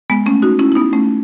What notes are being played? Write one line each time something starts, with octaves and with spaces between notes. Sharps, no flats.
G#3 B3
A3 C#4
D#4 F#4
C#4 E4
E4
B3 D#4
A3 C#4